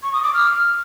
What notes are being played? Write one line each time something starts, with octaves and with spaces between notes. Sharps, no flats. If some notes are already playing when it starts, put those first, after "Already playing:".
C#6
D#6
D6
F6